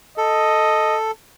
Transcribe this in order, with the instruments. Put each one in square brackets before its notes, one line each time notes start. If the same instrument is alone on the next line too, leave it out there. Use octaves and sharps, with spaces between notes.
[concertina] A4 [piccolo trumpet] D#5